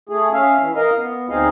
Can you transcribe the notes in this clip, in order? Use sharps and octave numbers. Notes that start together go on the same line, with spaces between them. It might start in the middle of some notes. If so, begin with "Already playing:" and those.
A3 G#4
C#4 E5 F5
E3
A#4 D#5 F5
B3
D2 C4 D#4 G#4 D#5 F5